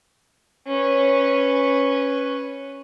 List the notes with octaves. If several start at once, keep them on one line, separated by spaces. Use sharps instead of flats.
C#4 B4